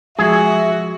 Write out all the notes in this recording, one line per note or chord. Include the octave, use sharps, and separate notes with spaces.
F3 G#3 F#4 G#4 E5